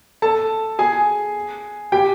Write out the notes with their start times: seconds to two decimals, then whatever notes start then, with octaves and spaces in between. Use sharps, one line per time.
0.22 A4 A5
0.79 G#4 G#5
1.92 G4 G5